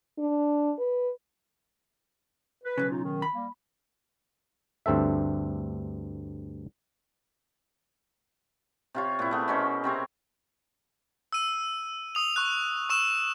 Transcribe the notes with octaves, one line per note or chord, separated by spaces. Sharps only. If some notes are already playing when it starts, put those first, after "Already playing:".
D4
B4
B4
B1 E2 C#3
D#4 F4
D#3
B5
G3 A#3
D2 G2 C4 A4 E5
C3 F4 C#5
A#2 C4 E4
A3 B3 G#4
B2 C#4 A#4 C5
C3 C4 C#5
E6 D#7
D#6 F7
C#6 F#6
C#6 E6 E7